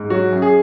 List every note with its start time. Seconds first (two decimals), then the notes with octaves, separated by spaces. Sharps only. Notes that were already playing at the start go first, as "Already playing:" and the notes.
Already playing: G#2
0.10 F#3 F#4
0.32 F#2
0.42 G#4